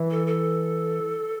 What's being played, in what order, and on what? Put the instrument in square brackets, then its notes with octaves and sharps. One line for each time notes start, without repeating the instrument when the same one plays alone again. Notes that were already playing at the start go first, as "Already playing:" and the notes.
Already playing: [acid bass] E3
[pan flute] A4
A4